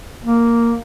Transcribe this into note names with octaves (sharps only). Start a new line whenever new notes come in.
A#3